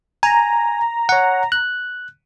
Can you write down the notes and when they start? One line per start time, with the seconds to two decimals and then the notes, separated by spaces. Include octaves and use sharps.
0.23 G#5 A#5
1.09 C#5 F#5
1.52 F#6